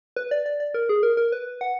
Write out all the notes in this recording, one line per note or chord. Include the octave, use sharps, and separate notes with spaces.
B4
D5
D5
D5
A#4
G#4
A#4
A#4
B4
F#5